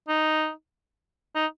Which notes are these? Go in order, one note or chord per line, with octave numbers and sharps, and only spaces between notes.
D#4
D#4